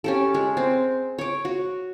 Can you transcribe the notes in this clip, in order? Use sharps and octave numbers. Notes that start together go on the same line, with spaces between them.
C#4 G4 A4
G#3
C4
C#5 D6
F#4